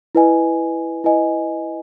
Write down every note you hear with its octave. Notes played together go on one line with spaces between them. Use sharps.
E4 B4 D#5 G#5
E4 B4 D#5 G#5